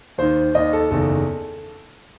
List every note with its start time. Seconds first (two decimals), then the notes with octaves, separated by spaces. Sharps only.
0.18 D#2 D#3 C5
0.55 D#2 D#3 D#5
0.73 A4
0.91 F#1 E2 D#3 A4